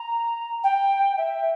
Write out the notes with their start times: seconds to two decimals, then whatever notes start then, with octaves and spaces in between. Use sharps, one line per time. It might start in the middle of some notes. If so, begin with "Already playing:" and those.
Already playing: A#5
0.64 G5
1.17 E5